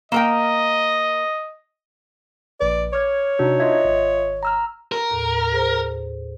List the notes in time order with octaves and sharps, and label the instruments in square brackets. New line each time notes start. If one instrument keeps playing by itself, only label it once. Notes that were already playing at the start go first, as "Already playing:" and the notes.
[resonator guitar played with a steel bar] A#3 A#4 G5 [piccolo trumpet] D#5
[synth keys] A#1 B4 [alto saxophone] D5
[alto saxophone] C#5 [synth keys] D6 F6 G#6
[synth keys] C3 F#4 [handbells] D4 D#4
[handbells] F4 D#5 E5 [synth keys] G#6
[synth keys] G#1
[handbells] A#5 E6 F6
[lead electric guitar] A#4
[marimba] D#2 A2
G#4 C5